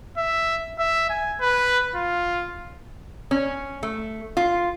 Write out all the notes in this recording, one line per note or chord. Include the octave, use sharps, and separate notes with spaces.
E5
E5
G#5
B4
F4
C#4
A3
F4